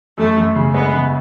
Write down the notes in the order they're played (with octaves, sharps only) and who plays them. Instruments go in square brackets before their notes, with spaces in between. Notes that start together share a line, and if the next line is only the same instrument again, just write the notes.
[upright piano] F#2 [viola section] A3
[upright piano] F#2
C#3
[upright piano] G#3 [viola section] B3
[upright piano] C#3